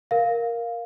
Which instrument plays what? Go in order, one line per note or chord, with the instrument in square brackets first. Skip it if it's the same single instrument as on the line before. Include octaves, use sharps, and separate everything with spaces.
[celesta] A#4 F5